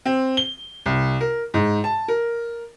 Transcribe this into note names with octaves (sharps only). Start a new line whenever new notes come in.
C4
G7
C2
A#4
G#2
A5
A#4